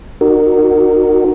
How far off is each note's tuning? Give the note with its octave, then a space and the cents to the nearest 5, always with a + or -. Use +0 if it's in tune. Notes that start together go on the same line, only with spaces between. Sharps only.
D#4 -45 F#4 +5 A#4 -15